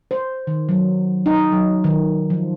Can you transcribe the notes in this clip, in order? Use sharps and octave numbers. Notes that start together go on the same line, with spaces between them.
C5
D#3
F#3
D#4
F#3
D#3
F3